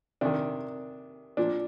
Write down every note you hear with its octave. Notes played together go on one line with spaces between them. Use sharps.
C3 D#3 D4
A#2 F3 D4